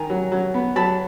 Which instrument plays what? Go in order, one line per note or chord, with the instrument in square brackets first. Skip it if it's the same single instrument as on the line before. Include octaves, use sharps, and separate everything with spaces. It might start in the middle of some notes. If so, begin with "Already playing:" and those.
Already playing: [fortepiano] D#3 G#5 A#5
F#3
F#3
B3
F#3 A5 B5